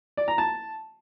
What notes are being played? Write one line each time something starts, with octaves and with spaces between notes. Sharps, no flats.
D5
A#5
A5